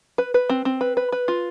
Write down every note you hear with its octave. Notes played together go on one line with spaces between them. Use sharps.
B4
B4
C4
C4
B4
B4
B4
F4